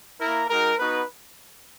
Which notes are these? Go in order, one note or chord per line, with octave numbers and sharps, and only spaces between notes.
A#3 E4 A#4
G#3 D#4 F#4 A#4
B3 D#4 F#4 B4